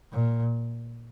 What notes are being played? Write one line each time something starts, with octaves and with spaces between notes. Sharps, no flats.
A#2